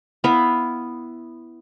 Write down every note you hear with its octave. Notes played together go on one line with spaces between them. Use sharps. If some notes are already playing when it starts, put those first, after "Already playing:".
B3 E4 F5